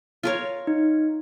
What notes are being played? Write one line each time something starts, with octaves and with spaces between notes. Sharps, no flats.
F4 A#4 C#5
D#4